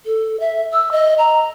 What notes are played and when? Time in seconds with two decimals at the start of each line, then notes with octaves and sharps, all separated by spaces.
0.06 A4
0.40 E5
0.73 E6
0.92 D#5
1.18 A#5